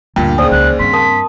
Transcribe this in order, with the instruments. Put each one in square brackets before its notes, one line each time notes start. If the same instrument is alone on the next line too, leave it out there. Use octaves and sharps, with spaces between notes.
[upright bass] D2 [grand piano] G2 A#2 [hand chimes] G5
[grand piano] D#2 C#3 [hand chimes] C5 D5 G#5 [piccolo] D#6
[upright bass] C#2 F3 [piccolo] F#6
[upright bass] G2 [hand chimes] A#3 C4 C6 [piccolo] B6
[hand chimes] A#4 A5 D#6